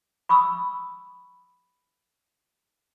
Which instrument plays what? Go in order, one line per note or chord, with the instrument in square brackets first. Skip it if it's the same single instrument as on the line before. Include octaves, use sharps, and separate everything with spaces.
[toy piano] B5 C#6 D#6 E6